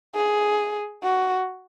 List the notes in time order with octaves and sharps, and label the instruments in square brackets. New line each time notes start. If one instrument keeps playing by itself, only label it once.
[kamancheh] G#4
F#4